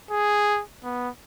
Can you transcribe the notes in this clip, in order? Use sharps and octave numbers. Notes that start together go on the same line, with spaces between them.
G#4
B3